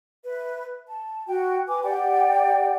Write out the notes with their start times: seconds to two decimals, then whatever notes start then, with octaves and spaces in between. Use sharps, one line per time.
0.24 B4 E5
0.87 A5
1.27 F#4 G5
1.68 B4 G#5 D6
1.84 G4 D5 F#5 G5